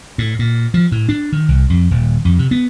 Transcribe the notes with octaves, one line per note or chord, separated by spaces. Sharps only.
A2
A#2
F3
A2
D4
D#3
C2
F2
D#1
F2
C3
B3